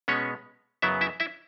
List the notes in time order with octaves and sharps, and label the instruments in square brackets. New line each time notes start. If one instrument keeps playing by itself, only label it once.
[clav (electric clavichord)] B2 G#3 B3 C#4 C#5
F#2 C#3 F#3 B3 E4 E5
E4 E5
E4 E5